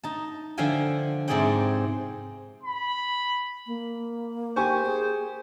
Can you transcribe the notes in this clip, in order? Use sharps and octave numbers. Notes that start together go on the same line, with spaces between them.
D#4 A5
D3 F3 E5 F5 G5 G#5
G#2 C3 C4 G#4 D5 G5
B5
A#3
G4 C5 G#5 C#6
G#4